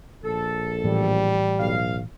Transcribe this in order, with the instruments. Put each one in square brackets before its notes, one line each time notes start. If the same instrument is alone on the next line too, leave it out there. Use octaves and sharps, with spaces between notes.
[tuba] A#1 [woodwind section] A4
[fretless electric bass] A2 E3 [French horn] G3
[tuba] B1 [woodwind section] F5